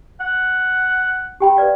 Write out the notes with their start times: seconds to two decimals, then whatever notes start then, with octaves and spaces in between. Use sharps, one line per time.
0.20 F#5
1.40 G4 G5 B5
1.57 B4 D5 F5